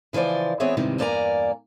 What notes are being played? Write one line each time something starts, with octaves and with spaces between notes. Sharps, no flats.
C#3 E3 F3 C5 D5
E3 B3 C4 G#4 C#5 E5
G#2 C3 D#3 E3 G3
E2 G2 A#3 D5 G#5 A#5